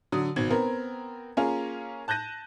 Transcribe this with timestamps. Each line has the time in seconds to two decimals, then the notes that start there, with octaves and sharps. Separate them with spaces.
0.12 D3 F#3 D#6
0.36 G#1 B2 G#6
0.50 B3 C4 A#4
1.37 A#3 C#4 F4 G#4 A#4
2.08 A5 F#6 G6 A#6 D#7